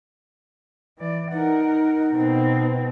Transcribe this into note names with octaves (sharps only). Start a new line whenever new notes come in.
E3 D5
D#4 A#4 F#5
B2 C4